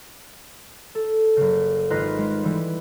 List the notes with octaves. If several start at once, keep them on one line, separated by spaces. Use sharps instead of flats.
A4
F#1 C#3
G#1 D#4 F4 B4 D#5 C7
G#3
E3 G3